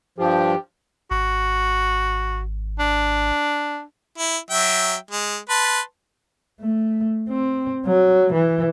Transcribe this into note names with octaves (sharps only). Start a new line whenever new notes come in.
G2 F3 G4
G#1 F#4
D4
E4
F#3 E5 G5
G#3
B4 A5 C6
A3
C4
F#3
E3